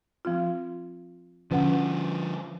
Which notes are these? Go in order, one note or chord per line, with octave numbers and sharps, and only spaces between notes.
F3 C4 F4
D3 F3 C#4 B4 F#5